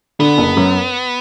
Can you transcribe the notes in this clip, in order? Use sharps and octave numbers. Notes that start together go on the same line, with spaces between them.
D3 B3
F#1
F#2